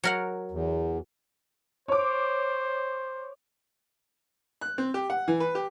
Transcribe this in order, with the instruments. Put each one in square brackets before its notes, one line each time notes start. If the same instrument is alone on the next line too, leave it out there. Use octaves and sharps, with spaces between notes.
[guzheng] F#3 A#4 F#5
[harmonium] E2
[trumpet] C5 [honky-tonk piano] C#5 D6
[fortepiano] F#6
C4
G4
F#5
E3
B4
G4